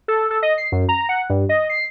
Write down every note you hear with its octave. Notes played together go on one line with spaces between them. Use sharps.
A4
A4
D#5
C7
F#2
A#5
F#5
G2
D#5
C7